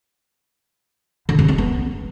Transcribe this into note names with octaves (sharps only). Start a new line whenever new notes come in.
D3
C#3
C4
B3